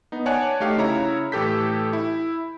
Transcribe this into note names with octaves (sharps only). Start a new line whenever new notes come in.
B3 D#4
C#5 D5 F#5 G#5 A5 F#6
A3 D#4 G4 F5
C#3 E4 C#5 A#5
A2 E3 G4 A4 G6 B6
E4